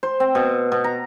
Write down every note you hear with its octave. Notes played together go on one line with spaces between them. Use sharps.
C5
C4
B2
B2
A#5